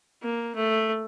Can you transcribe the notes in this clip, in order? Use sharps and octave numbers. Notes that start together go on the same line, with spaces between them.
A#3
A3